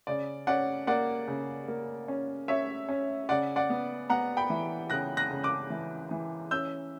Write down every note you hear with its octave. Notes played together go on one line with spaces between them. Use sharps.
C#3 D5
C#4 D5 F#5
A#3 D5 F#5
C#3
A#3
C#4
C#4 C#5 E5
C#4
C#3 D5 F#5
D5 F#5
B3
B3 F#5 A#5
G5 B5
E3
C#3 F#6 A#6
F#6 A#6
C#3
D6 F#6
E3
E3
C#4 E6 G6